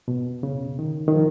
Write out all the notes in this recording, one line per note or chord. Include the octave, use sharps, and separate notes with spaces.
B2
C#3
D#3
D#3
F3